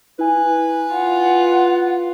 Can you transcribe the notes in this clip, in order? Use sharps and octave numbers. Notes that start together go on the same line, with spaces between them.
E4 B4 G#5
F4 F#5